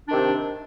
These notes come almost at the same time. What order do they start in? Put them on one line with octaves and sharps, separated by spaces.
D4 D#3 C3